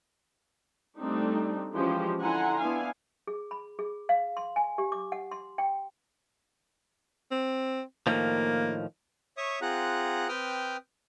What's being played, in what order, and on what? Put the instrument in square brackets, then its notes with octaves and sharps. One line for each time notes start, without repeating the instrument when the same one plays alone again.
[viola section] G3 A3 C4 D4 D#4
E3 F3 G#3 C#4 G4 C5
D3 E4 F#5 G#5 A#5 C6
B3 D4 E4 F5 G#5
[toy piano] G#4
B5
G#4
F5
C6
G#5
G4
D6
F#5
C6
G5
[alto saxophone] C4
[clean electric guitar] A2 D#3 F3 [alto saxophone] A#3
[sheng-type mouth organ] C#5 E5 C#6 D#6
C4 F4 G#4 F#5 A#5 F#6
C4 B4 G5 D#6 F6 G6